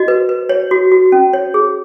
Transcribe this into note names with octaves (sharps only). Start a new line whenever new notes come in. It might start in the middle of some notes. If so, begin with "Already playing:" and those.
Already playing: F#4 D#5
B4
B4
C#5
F#4
F#4
C#4
C#5
G#4